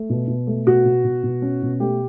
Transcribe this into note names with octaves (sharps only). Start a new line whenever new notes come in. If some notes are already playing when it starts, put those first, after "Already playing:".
Already playing: A3
B2
B2
A3
B2 F#4
B2
B2
B2
C#4
B2
A3 G4